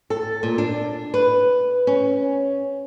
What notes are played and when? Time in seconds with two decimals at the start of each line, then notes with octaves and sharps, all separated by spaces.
0.10 A4
0.43 A#2
0.58 D4
1.14 B4
1.87 C#4